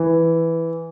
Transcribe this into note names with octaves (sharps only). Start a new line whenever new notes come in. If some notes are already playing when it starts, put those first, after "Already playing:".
Already playing: E3